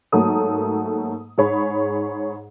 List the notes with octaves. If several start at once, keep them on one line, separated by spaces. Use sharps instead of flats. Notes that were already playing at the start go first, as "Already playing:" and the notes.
G#2 F#3 A3 A#3 D#6
G#2 G#4 C#5 B5